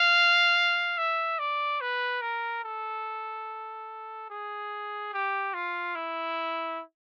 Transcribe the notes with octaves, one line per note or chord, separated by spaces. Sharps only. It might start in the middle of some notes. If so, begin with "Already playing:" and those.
Already playing: F5
E5
D5
B4
A#4
A4
G#4
G4
F4
E4